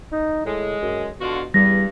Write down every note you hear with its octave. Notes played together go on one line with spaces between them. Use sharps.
D#4
A2 G#3
F#2
B2 D3 F4 F#4
E2 G2 G3 A#6